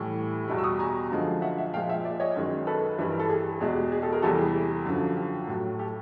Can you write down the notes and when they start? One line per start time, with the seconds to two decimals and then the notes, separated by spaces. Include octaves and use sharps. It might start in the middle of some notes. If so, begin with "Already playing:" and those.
Already playing: A2 E3 G3
0.48 E2 B2 G3
0.58 E6
0.64 C#6 D#6
0.79 G#5 A#5
1.11 F#2 D3 F3 G#3
1.42 E5 F#5
1.57 E5 F#5
1.73 A#2 F3 G#3 F5 G5
1.89 E5 F#5
2.04 D5 E5
2.20 C#5 D#5
2.36 F#2 D#3 G#3
2.67 A4 B4
2.99 G2 E3 G3 B4
3.11 A#4
3.19 A4
3.30 G#4
3.60 E2 B2 G#3 G#4
3.76 G4
3.92 G#4
4.02 G4 A4
4.13 G#4 A#4
4.22 E2 C3 E3 G3 G4 A4
4.39 G#4
4.86 F#2 D3 F3
5.16 G4
5.48 A2 F#3
5.79 G4 A4